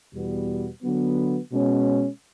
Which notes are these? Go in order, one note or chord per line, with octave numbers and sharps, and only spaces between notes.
E2 B2 G3 B3
D3 F#3 B3
B2 G#3 C#4